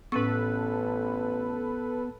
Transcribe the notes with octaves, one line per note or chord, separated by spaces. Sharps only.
A1 A2 B3 C#4 A4 B4 C#6